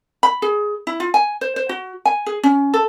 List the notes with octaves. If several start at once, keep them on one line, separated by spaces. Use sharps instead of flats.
B5
G#4
E4
F4
G#5
C5
C5
F#4
G#5
G#4
C#4
A4